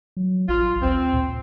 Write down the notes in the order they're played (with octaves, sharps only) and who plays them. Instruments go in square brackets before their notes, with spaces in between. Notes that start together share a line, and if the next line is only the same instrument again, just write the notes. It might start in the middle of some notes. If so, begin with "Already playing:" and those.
[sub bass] F#3
[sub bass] A1 [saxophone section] F4
[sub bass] D2 [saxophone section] C4
[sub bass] A#2